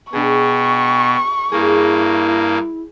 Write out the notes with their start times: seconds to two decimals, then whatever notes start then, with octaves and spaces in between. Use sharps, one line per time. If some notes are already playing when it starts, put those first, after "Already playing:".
0.13 B2 D4 F#4 G#4 G5 C#6
1.52 G2 A#3 E4 G#4